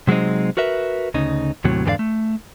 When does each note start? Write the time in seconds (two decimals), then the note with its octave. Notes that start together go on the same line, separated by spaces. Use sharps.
0.07 C3 F#3 G#3 C4 D#4
0.57 F#4 A#4 B4 E5
1.14 D2 C#3 D#4
1.64 D#2 A2 C3 F#3
1.85 E2 G#2 D3 G4 D5 F5
1.99 A3